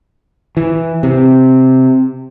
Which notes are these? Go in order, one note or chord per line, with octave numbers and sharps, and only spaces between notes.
E3
C3